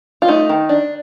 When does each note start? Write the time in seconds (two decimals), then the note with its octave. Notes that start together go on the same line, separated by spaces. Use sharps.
0.22 F4
0.28 A3 D#4
0.49 D#3
0.69 D4